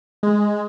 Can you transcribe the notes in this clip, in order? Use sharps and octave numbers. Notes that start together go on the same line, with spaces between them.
G#3